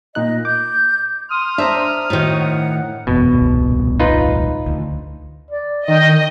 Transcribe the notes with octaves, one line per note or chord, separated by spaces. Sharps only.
A#2 D#4 D#5 F#6
D6 G6
C6 D#6 F6
D4 C5 E5 A#5
A2 D#3 F#4
F#5
F#1 E2 B2
D#1 C2
D#4 F4 B4
D2
D5
D#3 D#5 G5